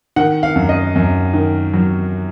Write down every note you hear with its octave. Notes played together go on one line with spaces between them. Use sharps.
D#3 F#5
F5
F#2
D#5
F#2
D#3
F#3